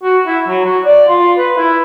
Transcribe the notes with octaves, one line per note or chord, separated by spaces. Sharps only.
F#4
E4
F#3
F#4
D5
F4
B4
E4